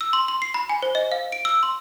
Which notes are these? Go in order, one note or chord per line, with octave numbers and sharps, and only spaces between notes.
E6
C6
C6
C7
B5
G#5
C5
D#5
F5
D7
E6
C6